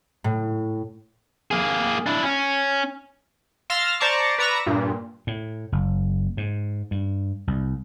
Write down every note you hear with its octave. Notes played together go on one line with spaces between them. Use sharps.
A2
A#3 G#4
D4 E4
C#4
F5 C6 E6 F6 A6 A#6
C5 D5 A5 A#5 C#6 D6
B4 D5 A#5 C#6 E6 A#6
G2 A#2
A2
F#1
G#2
G2
C2